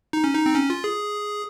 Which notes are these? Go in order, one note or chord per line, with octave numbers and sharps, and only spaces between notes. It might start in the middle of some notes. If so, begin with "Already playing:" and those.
D#4
C#4
D#4
C4
C#4
F4
G#4